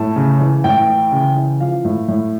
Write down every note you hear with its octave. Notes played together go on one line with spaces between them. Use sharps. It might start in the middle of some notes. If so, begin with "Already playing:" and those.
Already playing: A2 A5
C#3
E3
A2 G5
E3
C#3
E3
F3 F5
A2
A2